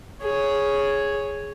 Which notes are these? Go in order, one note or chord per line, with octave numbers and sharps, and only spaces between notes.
G#4 C#5